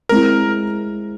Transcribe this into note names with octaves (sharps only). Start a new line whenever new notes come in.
G#3 C4 E4 A#4